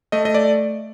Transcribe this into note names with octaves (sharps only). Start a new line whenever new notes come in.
A3 D#5
D#5
D5